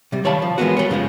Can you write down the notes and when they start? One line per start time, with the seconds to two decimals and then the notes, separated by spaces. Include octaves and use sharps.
0.12 C3 G3
0.24 D#3 C#5 D5 F5 A5 B5
0.42 F3
0.58 E3 G#3 A#3 B3 F#4
0.77 G3 C#5
0.89 F#2 C#3 F3 G#3